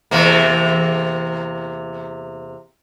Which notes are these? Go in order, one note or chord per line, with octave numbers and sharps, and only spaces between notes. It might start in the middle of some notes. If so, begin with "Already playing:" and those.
E2 C3 A#3